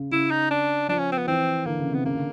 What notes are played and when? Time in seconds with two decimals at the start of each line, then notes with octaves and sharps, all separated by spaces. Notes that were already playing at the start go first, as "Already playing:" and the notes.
Already playing: C#3
0.11 C#3 E4
0.31 D#4
0.51 D4
0.88 F3 D4
0.99 C#4
1.12 C4
1.18 B3
1.27 E3 C4
1.66 D3 A#3
1.79 C#3
1.92 C3 B3
2.05 C#3 A#3
2.15 D3